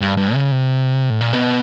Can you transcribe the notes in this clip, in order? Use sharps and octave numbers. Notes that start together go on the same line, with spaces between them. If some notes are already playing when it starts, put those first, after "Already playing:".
G2
G2
C#3
C3
A2
A#2
B2